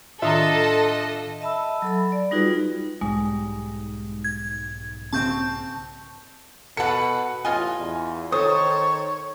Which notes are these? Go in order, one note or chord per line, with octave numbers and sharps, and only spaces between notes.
A2 D#3 D4 F4 A4 D#5 E5 A#5
D#5 E5 A5 B5 E6
F#3 A4 B5
D5
G3 D#4 F4 F#4 G#4 B4
B1 G#2 G3 G#3
G#6
C#3 C4 A5 C#6 G6
B2 A4 B4 F#5 C#7
A1 F4 D#5 G#5
E2
D#3 A4 C5 C#5 D#6